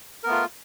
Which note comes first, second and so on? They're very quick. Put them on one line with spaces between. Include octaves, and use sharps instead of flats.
A#4 B3 A3 F4